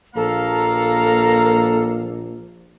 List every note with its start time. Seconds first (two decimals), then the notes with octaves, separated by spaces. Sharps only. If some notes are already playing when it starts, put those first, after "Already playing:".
0.16 A#1 A#3 A4 A#4 F5 A#5